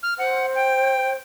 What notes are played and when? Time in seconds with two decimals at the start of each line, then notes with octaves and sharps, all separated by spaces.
0.03 F6
0.18 C5 F#5
0.55 G5